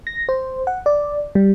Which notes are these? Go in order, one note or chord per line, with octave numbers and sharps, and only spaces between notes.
A#6
C5
F#5
D5
G3